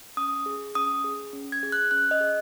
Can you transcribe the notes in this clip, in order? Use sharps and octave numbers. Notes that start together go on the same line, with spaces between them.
C#4 D#6
G#4
C#4 D#6
G#4
C#4
G#6
G#4
F#6
C#4 F#6
D#5
G#4